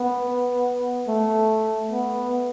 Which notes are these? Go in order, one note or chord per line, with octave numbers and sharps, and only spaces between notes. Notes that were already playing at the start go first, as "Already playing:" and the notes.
Already playing: B3
A3
B3